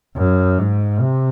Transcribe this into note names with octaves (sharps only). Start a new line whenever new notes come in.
F#2
G#2
C3